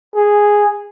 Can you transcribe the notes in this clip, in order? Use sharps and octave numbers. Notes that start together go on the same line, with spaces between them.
G#4